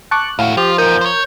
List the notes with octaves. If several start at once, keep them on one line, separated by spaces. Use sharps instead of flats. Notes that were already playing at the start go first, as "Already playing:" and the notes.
A5 C#6 D6 F#6
D#2 A2 F#4 F5
F3 F4 G4
E2 D#4 A#4 G6
C5 C#5